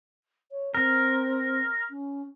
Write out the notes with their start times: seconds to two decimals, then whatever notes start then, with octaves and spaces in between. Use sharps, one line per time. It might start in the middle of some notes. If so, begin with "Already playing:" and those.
0.51 C#5
0.75 C4 A#4
1.90 C#4